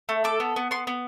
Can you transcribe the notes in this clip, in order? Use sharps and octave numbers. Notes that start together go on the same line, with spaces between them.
A3
A4 D6
B3
B3
B3 C6
B3